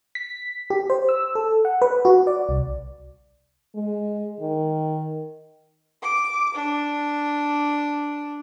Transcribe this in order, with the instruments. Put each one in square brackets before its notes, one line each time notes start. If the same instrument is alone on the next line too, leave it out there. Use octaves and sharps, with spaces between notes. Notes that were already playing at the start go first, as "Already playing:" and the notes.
[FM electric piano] B6
G4
C5
E6
A4
F#5
B4
F#4
D5
C2
[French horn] G#3
D#3
[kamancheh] D6
D4